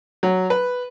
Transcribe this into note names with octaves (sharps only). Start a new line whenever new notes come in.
F#3
B4